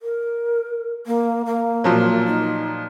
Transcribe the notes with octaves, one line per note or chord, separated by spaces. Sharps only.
A#4
A#3
A#3
A#2 F3 F#3
D#4